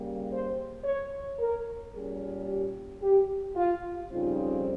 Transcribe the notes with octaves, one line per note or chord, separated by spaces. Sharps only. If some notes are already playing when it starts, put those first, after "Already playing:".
Already playing: C#3 G3 A#3
C5
C#5
A#4
A#2 G3 C#4 G#4
G4
G4
F4
F2 C#3 G3 C4 D#4 F4